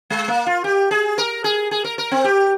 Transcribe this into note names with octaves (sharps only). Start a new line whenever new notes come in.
G#3
A#3
F4
G4
G#4
A#4
G#4
G#4
A#4
A#4
C4
G4